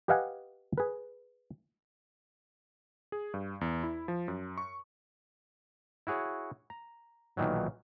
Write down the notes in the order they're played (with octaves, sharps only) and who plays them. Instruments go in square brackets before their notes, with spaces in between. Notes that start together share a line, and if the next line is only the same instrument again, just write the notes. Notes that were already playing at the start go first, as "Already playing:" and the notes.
[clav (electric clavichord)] G4 B4 D#5 F5 F#5 G#5
G#4 B4
[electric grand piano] G#4
G2
E2
E4
F3
F#2
C#6
[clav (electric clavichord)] E4 F#4 G#4 C#5
A#5
B1 A#2 D#3 E3 F#3